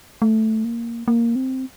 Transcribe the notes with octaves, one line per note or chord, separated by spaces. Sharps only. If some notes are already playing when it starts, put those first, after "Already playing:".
A3
A#3
A#3
C4